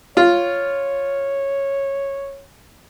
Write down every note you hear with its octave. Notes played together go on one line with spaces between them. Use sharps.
F4 C#5